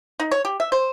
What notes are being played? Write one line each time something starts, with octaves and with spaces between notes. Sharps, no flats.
D#4
C#5
G4
E5
C5